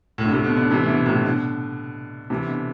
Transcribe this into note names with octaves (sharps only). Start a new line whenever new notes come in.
A2
D3
A2 C3
B2 D3
B2 D3
C3 E3
E3
B2 D3
A2 C3
B2 D3
C3 E3
B2 D3